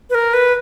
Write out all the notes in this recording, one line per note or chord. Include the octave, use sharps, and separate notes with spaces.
B4
A#4
B4